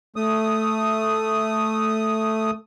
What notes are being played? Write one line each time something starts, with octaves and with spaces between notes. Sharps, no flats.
A3 D#6